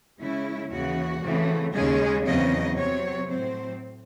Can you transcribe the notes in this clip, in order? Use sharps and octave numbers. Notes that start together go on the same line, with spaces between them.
C#3 G#3 C#4 E4
D#2 C#3 E3 F#4
C#3 E3 A3 C4
D#2 C#3 G#3 C#4 G#4
E2 C#3 F#3 C4 D#5
C3 F#3 C4 C#5
A2 F#3 C4 C5